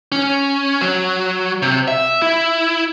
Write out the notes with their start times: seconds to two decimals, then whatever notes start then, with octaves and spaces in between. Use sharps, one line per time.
0.12 C#4
0.81 F#3
1.62 C3
1.88 E5
2.22 E4